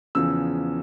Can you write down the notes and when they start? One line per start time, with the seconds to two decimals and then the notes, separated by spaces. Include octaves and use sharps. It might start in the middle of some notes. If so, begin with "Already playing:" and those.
0.15 E2 C#3 F3 E6